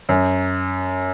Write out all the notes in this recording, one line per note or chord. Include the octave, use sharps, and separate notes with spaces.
F#2